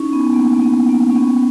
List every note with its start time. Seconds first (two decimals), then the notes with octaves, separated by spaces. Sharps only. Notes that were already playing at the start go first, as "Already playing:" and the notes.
Already playing: C#4 D#4 E4
0.13 B3
0.34 A#3
0.62 B3
0.89 A#3
1.11 C#4
1.16 B3